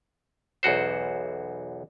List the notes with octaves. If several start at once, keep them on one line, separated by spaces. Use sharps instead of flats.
B1 E2 F#4 C5